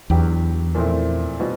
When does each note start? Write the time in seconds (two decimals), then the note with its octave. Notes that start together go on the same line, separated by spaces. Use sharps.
0.10 E2 F#3 B3 D4 G4
0.75 A#2 F3 A3 C4 E4
1.40 B2 G3 C4 F4